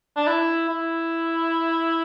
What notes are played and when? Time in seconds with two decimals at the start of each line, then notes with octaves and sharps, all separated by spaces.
0.16 D4
0.27 E4
0.69 E4